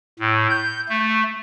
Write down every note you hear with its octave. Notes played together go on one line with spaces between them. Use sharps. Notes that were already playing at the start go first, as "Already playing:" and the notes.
A2
G6
A3